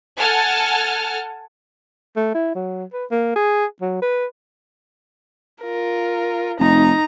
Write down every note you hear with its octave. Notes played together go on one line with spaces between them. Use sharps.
A4 F#5 G#5 A5 F6
A3
E4
F#3
B4
A#3
G#4
F#3
B4
F4 A#4
F1 D#4 A#5